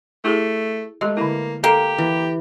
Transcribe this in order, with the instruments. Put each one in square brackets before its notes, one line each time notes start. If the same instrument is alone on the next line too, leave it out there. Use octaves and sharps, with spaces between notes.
[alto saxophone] A3 [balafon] E4 G4 G#4
[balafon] G#3 G4 D#5 [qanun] A3
[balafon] D3 E4 [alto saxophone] A#3
[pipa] A#3 [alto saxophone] G4 [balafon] A4
[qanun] E3